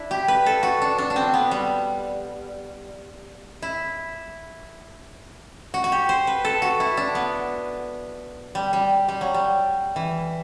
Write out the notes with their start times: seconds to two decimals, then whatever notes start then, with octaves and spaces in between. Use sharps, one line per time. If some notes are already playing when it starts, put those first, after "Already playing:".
Already playing: D4 E4
0.11 G4
0.28 B4
0.46 A4
0.63 F#4
0.82 D4
0.98 D4
1.10 D4
1.16 C4
1.34 B3
1.51 G3
3.62 E4
5.74 F#4
5.84 F#4
5.92 G4
6.09 C5
6.27 B4
6.45 A4
6.62 F#4
6.80 E4
6.97 D4
7.15 B3
8.55 G3
8.73 G3
9.08 G3
9.21 F#3
9.34 G3
9.96 E3